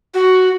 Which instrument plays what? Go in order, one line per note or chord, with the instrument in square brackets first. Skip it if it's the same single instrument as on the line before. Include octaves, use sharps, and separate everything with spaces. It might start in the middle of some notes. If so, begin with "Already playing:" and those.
[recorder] F#4